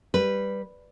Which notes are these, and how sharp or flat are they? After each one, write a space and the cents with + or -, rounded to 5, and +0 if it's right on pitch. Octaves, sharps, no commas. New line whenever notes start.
G3 +0 B4 +0